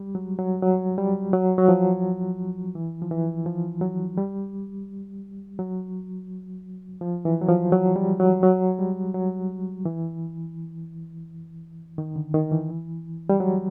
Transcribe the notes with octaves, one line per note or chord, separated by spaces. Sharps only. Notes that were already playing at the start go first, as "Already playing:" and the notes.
Already playing: G3
F#3
F#3
F#3
G3
F#3
F#3
F3
E3
F3
E3
F3
F#3
G3
F#3
F3
E3
F#3
F3
F#3
G3
F#3
F#3
G3
F#3
E3
D#3
D3
D#3
E3
G3
F#3